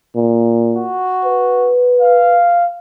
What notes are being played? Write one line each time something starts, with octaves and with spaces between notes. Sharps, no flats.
A#2
F#4
B4
F5